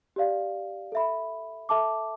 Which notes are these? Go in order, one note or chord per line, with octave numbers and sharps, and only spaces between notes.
G4 D5 F5
A4 E5 B5
A4 E5 A5 D6